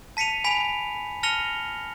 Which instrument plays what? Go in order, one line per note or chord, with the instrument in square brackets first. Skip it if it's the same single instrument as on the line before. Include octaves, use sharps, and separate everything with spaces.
[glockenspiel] A5 B6 C#7 D#7 F7
G#5 B5 B6 F7
A5 F6 A#6 C#7 F7 G7